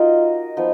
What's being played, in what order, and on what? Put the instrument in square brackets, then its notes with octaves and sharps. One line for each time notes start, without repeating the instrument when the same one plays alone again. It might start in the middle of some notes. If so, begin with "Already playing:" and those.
Already playing: [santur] D#4 F#4 A#4 D#5 [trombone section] F4
[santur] F3 B3 D#4